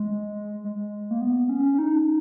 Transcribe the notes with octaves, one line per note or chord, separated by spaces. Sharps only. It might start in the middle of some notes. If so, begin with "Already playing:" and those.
Already playing: G#3
G#3
A#3
B3
C#4
C#4
D#4